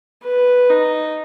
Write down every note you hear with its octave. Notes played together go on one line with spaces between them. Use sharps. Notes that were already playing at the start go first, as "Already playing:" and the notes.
B4
D#4